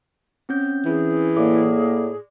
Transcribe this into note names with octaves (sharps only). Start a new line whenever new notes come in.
C4 C#4 G6
E3 G#4
A2 A#3 D5 D6